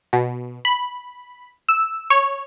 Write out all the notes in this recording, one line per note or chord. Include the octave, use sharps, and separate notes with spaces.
B2
B5
E6
C#5